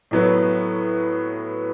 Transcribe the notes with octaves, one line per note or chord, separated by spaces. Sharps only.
A2 F#3 B3